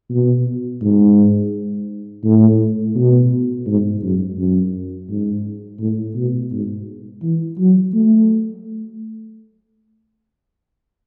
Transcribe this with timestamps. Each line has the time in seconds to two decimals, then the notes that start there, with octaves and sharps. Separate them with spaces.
0.11 B2
0.82 G#2
2.24 A2
2.95 B2
3.67 G#2
4.02 F#2
4.38 F#2
5.09 G#2
5.80 A2
6.16 B2
6.52 G#2
7.22 E3
7.58 F#3
7.94 A3